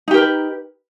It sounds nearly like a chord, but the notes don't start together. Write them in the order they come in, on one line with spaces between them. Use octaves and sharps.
D#4 G4 A#4 B4